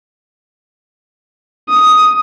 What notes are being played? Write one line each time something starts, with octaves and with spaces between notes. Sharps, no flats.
D#6